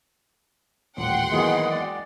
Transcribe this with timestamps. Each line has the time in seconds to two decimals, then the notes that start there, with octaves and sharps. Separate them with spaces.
0.97 D#1 A1 F#5 G5 C6
1.32 D#3 E3 F#3 A#3 B3 G#4 D#5
1.71 G#3 D5